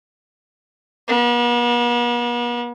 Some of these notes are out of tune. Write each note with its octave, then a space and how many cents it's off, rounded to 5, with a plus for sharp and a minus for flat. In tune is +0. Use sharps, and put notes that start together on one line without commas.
B3 -45